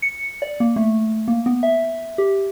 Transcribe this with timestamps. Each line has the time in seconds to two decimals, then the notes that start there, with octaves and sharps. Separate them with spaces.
0.02 C#7
0.42 D5
0.60 A#3
0.76 A3
1.28 A#3
1.46 B3
1.63 E5
2.18 G4